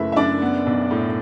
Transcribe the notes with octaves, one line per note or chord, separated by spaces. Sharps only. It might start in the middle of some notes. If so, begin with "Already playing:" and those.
Already playing: F#1 A3 E4 B4 E5
E5
F#2 D4 D5
B3
B1
A2